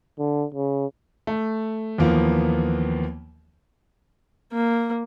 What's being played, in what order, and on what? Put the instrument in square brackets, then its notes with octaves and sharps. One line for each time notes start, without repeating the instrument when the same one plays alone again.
[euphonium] D3
C#3
[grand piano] A3
D#2 E3 F3 A#3 B3
[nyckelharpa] A#3